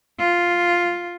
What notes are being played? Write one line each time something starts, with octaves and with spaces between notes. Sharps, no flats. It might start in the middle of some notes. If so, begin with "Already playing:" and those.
F4